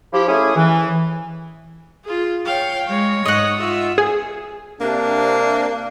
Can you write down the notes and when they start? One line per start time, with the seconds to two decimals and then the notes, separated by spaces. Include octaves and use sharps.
0.13 F3 E4 G4
0.28 A3 C#4 E4 G#4
0.56 E3
2.04 F4 G#4
2.46 C#5 F5 G5
2.87 G#3 C#5
3.26 G#2 D#5 F#5
3.56 F4 E5
3.98 G#4
4.80 C3 A#3 D4